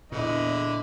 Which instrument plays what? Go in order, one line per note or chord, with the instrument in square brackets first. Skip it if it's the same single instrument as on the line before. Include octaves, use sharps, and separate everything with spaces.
[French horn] E2 [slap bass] A#2 [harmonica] D3 E4 [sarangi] D#5